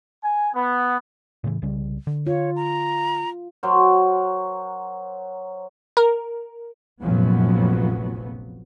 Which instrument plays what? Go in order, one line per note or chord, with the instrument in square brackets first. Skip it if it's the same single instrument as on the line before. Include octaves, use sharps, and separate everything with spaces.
[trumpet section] G#5
B3
[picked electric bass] A2 C#3 E3
C2 C#3 G3
D3
[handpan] F4 [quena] C#5
[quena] A#5
[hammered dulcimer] F#3 A#4 C5
[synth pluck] A#4
[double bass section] F1 A#1 F#2 F3 F#3 B3